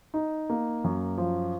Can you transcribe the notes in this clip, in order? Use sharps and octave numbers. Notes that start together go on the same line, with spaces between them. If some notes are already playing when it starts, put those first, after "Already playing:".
D#4
A#3
F#2
F3